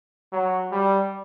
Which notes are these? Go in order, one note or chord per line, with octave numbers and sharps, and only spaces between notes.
F#3
G3